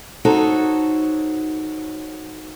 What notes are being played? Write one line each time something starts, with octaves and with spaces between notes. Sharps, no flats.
D#4 F#4 A4 C5 C#5